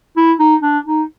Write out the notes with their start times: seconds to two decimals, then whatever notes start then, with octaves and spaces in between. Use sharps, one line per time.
0.17 E4
0.39 D#4
0.62 D4
0.86 D#4